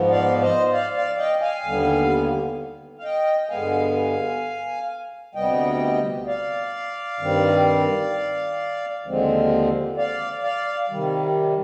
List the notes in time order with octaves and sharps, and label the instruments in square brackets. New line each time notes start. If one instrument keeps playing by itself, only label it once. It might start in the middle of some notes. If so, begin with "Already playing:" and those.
Already playing: [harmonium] G#2 F3 B3
D5 F5
C5 D#5
D5 F5
D5 F5
D#5 G5
F5 G#5
D#2 D3 G3 B3
F5
D#5 G5
G2 D3 G#3 B3 F5 G#5
D2 C3 G3 B3 D#5 G5
D5 F5
G2 D#3 G3 C4
D#2 D3 F3 G#3 C4
D5 F5
D5 F5
C3 D#3 G3